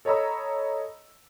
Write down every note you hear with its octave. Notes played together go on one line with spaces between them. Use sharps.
A4 C#5 D#5 A#5 B5 E6